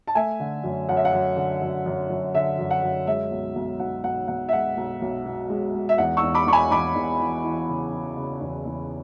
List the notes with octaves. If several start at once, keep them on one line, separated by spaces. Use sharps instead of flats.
A5
A3 E5 G#5
D3
F#2
F#2 F#5
E5
F#5
F#2
D3
F#2
F#2
F#2
D3 E5
F#2
F#5
F#2
G#3 E5
B1
B1
B1 F#5
B1 F#5
B1 F#5
E5
G#3 F#5
B1
B1
B2
G#3
G#3
E5
E2 F#5
C#6 E6
E2
B5 D6
E2 C#6
G#5 B5
E2 B5 D6
E2
E3
E3
C#3
E3
C#3
E2
E2